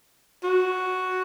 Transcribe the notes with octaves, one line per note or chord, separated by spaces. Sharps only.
F#4